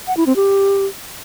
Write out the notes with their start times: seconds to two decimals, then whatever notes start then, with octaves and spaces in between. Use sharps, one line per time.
0.07 F#5
0.17 E4
0.27 C4
0.36 G4